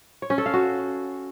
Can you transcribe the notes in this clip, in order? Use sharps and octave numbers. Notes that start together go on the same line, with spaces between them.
C#5
C#4
A4
F5
F#4